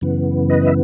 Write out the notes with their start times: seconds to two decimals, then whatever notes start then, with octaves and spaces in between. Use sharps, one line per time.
0.01 F#2 C#3 E3 B3
0.50 B4 D#5
0.67 E5